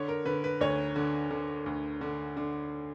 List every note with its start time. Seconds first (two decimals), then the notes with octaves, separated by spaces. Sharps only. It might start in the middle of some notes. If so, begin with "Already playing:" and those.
Already playing: D3 C#5
0.08 A#4
0.26 D3 B4
0.44 B4
0.61 D2 C#5
0.96 D3
1.31 D3
1.66 D2
2.01 D3
2.37 D3